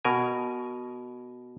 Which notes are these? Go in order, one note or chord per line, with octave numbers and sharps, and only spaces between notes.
B2 A#4 G#5